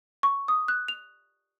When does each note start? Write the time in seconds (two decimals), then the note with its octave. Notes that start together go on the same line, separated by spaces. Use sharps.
0.23 C#6
0.48 D#6
0.68 F#6
0.88 F7